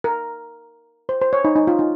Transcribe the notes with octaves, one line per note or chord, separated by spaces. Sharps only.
A#4
C5
C5
C#5
D#4
D#4
F4
D#4